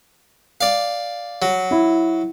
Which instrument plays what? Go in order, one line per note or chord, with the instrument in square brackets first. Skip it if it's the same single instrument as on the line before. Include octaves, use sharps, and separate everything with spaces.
[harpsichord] D5 F5
F#3
[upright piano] E4